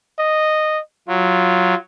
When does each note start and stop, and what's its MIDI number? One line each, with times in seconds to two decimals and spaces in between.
0.19 0.80 75
1.08 1.75 54
1.08 1.76 65